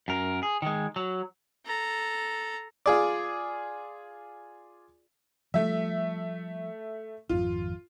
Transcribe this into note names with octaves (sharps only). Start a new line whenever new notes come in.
F#2 A#4
G#4
D#3 G#3
F#3
A4 A#5
F4 G#4 D5
F3 G3 A3 E5
G#1 F2 F4